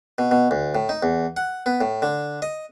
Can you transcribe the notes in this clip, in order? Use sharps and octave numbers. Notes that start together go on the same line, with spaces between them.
B2
B2
D2
A2
D#4
E2
F#5
B3
A2
D3
D#5